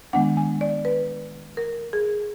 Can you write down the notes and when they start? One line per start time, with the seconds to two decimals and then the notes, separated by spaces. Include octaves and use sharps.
0.13 D#3 G#3 B3 D4 F#5
0.37 G#5
0.61 D5
0.85 B4
1.57 A#4
1.93 G#4